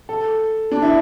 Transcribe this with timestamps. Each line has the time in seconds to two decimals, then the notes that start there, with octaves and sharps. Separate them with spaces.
0.09 A4
0.72 D4
0.82 E4